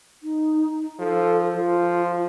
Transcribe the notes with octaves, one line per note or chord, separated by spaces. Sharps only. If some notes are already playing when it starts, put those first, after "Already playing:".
D#4
F3 A4
F3 F4